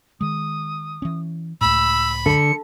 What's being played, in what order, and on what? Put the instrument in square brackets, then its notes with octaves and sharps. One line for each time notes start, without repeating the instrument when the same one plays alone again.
[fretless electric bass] D#3 G#3 [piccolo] D#6
[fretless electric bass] E3 C#4
[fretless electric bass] C#2 A2 [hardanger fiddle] B5 [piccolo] E6
[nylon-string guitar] D3 [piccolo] C#7